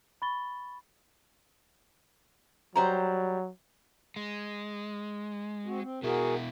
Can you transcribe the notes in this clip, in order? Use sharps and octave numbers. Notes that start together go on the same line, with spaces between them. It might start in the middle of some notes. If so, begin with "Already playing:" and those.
B5 C#6 A6 G7
F#3 G3 C5 A#5
G#3
C4 F#4
C4
B2 E4 F#4 G#4 A#4